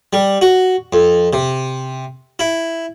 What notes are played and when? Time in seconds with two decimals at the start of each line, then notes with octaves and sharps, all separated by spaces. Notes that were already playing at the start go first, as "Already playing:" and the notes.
0.13 G3
0.42 F#4
0.93 F2
1.33 C3
2.39 E4